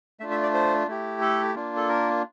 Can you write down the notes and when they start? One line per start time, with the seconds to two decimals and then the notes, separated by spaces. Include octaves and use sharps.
0.20 A3 D4 F4 E5
0.31 E5
0.43 D5
0.54 C5
0.88 A3 E4 G4
1.21 A4
1.55 A#3 D4 F4
1.77 A4
1.89 A#4